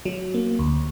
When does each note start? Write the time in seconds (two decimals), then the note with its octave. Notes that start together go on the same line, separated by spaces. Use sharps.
0.05 F#3
0.34 A#3
0.59 D2